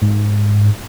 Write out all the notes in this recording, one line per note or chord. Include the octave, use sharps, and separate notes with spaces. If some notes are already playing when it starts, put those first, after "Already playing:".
G#2